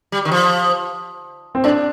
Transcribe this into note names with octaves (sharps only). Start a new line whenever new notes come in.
G3
D#3
F3
C4
A2 D4